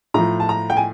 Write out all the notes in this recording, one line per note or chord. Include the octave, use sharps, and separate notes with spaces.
A2 F3 A#5
A5
A#5
G5
G#5